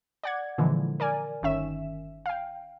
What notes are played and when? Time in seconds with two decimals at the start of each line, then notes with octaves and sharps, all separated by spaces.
0.24 D5 F#5 G#6
0.58 A#2 D3 E3 F3 G#3
1.00 A#4 D5 G#5
1.42 G1 D#3 C#4 E5 E7
2.26 F5 G5